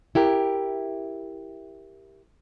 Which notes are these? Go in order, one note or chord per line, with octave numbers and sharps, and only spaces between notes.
E4 G4 A#4